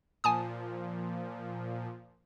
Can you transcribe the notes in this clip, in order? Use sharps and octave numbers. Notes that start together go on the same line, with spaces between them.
A#2 F3 G#5 A5 D#6